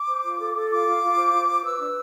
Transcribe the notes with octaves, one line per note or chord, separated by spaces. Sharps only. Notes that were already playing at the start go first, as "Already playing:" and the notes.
Already playing: D6
C5
F4
A4
A4
F4 D6
F4
F4
C5
F4
C5
B4 E6
D4